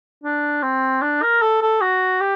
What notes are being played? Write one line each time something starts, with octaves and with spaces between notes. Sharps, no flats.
D4
C4
D4
A#4
A4
A4
F#4
G4